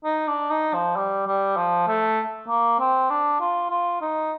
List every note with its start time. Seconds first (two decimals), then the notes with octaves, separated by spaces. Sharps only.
0.04 D#4
0.28 D4
0.50 D#4
0.74 F3
0.96 G3
1.27 G3
1.57 F3
1.88 A3
2.48 A#3
2.80 C4
3.10 D4
3.40 F4
3.70 F4
4.01 D#4